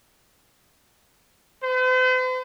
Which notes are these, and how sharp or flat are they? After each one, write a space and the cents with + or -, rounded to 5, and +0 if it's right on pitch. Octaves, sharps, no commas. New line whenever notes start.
C5 -45